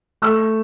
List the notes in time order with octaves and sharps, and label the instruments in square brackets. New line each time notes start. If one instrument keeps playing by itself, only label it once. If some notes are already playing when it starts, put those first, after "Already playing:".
[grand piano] A3 E6